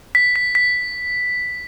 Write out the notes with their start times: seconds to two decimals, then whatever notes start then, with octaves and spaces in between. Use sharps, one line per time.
0.15 B6
0.36 B6
0.55 B6